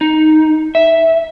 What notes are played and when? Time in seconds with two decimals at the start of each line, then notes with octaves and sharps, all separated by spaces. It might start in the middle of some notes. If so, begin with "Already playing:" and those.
0.01 D#4
0.75 E5